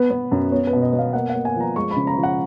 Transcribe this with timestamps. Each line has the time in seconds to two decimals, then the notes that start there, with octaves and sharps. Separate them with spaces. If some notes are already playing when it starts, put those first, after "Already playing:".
Already playing: B3 B4
0.10 B3
0.32 F#2
0.52 B3 C#5
0.67 B4
0.73 B2
0.83 D#5
0.93 B3
0.98 F5
1.13 A#3 F#5
1.30 F#5
1.35 A#3
1.45 G#5
1.56 F3 A#5
1.76 G#3 C#6
1.91 B5
1.96 C#3
2.07 A#5
2.17 F3
2.23 F#5